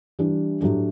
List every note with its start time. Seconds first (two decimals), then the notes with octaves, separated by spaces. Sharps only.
0.19 E3 G3 D4
0.61 A2 F#3 A3 D4 G4